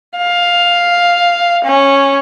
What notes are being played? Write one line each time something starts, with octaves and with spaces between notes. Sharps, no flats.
F5
C#4